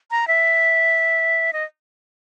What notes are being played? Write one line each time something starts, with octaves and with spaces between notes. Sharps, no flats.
A#5
E5
D#5